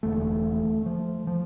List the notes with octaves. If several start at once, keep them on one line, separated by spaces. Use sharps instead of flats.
E1 E2 D3 A3
F3
F3